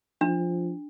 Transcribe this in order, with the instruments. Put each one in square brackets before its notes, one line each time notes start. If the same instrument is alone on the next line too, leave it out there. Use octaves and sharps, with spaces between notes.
[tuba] F3 [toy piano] D4